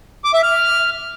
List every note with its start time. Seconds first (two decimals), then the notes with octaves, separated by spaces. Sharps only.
0.24 D6
0.34 E5
0.43 F6